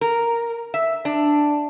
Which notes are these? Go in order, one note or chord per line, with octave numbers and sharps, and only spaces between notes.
A#4
E5
D4